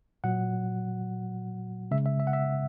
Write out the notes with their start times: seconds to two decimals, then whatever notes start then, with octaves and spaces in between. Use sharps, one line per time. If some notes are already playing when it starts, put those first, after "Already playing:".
0.24 A#2 F#3 F#5
1.91 C#3 G#3 E5
2.06 E5
2.20 E5
2.27 F#5
2.33 E5